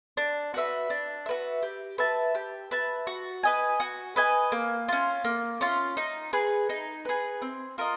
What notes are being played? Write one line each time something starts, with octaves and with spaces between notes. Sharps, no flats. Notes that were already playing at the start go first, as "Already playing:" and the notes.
D4
F#4 B4 E5
D4
F#4 B4 E5
G4
B4 E5 A5
G4
B4 E5 A5
F#4
B4 D#5 G#5
F#4
B4 D#5 G#5
A#3
C#4 F4
A#3
C#4 F4
D#4
G#4 B4
D#4
G#4 B4
C4
F4 A#4 D#5